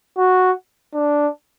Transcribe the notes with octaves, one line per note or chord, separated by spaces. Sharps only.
F#4
D4